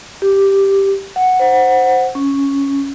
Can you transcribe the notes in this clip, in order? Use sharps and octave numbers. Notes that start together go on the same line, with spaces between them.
G4
F#5
C5 F#5
C#4